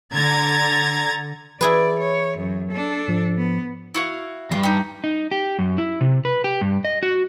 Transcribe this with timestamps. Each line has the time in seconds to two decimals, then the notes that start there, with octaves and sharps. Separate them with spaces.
0.14 D3 A#5 G#6 A6
1.61 E3 E4 G#4 B4 D5
2.00 C#5
2.38 F#2
2.72 D4 A4
3.08 G#2 F3
3.37 B3
3.94 E4 F#4 F5
4.52 E2 G2 F4
4.63 D#4 G4
5.04 D#4
5.32 G4
5.59 F#2
5.78 E4
6.01 C3
6.25 B4
6.44 G4
6.61 G2
6.85 D#5
7.03 F#4